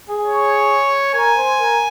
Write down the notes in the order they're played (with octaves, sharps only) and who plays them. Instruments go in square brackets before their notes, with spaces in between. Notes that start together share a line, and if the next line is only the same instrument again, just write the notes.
[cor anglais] G#4
[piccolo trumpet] C#5
[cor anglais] A#4 [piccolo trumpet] G#5
[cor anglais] C5
A#4